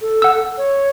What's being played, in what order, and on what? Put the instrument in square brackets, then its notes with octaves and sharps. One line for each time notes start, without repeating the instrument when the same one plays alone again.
[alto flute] A4
[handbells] F#5 E6
[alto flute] C#5